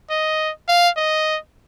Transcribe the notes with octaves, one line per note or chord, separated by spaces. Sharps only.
D#5
F5
D#5